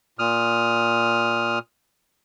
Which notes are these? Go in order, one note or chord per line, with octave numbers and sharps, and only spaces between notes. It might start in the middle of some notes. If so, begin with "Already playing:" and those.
A#2 D#6 F6